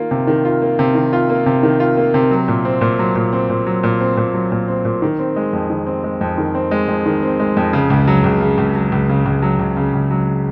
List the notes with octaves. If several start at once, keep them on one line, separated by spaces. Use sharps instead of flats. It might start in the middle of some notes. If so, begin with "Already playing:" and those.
Already playing: D#3 A#3 F4
C3
D#3
F4
A#3
C3
D#3
F4
A#3
C3
D#3
F4
A#3
C3
F#3
A#2
C4
A#2
F#3
A#2
C4
A#2
F#3
A#2
C4
A#2
F#3
A#2
C4
A#2
D#3
C4
G#3
F2
D#3
C4
G#3
F2
D#3
C4
G#3
F2
D#3
C4
G#3
F2
C#3
C#2
F#3
C#2
C#3
C#2
F#3
C#2
C#3
C#2
F#3
C#2
C#3
C#2
F#3